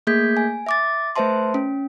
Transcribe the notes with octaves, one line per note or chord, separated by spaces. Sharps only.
A3 A#3 G#4 G6 G#6 B6
G#5
E5 D6 A6
A3 B4 C5 E5 A5 C6
C#4